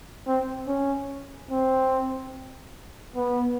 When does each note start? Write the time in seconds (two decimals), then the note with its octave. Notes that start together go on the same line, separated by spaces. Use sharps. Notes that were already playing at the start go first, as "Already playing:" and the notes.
0.27 C4
0.67 C#4
1.50 C4
3.16 B3